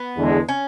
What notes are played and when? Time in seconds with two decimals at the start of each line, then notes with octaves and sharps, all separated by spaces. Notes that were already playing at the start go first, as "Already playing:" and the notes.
Already playing: B3
0.17 E2 D3 G#3
0.49 C#4